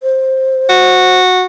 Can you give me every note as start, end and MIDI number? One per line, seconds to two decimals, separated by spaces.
0.03 1.20 72
0.69 1.45 66